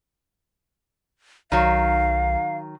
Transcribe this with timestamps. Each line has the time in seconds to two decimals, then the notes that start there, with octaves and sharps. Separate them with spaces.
1.52 B1 D#3 F#3 F5